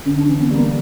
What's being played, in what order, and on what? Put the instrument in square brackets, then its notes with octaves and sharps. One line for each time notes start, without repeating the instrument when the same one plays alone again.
[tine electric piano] D3 [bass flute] C#4
[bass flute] D4
[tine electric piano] E3 [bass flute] C#4
[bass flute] B3
[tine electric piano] G3 [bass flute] A#3